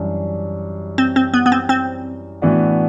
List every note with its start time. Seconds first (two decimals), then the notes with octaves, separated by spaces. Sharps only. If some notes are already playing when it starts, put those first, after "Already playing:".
Already playing: F#2 E3 G3 D4
0.98 C4
1.16 C4
1.34 B3
1.46 B3
1.52 C4
1.69 C4
2.42 A2 E3 B3 D4 F#4